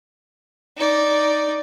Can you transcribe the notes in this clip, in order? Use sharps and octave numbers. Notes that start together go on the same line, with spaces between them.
D#4 D5